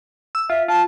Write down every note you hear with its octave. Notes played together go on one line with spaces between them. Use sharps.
E6
F4 E5
F4 A5